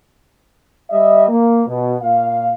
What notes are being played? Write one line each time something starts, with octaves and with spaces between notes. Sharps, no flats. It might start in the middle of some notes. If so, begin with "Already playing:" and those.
G3 D#5 E5
A#3
B2
A#2 F5